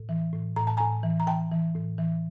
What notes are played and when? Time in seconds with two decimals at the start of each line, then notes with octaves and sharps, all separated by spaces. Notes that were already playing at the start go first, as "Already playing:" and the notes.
Already playing: A2
0.09 E3
0.33 A2
0.56 A2 A#5
0.67 A5
0.77 A2 G#5 A#5
1.03 E3
1.20 A#5
1.27 E3 G5 A5
1.51 E3
1.75 A2
1.98 E3